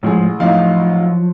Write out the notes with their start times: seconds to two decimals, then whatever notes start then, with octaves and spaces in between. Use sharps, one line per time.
0.03 A1 G#2 F3 G#3 G#4
0.40 A1 F3 F#3 D#4 F5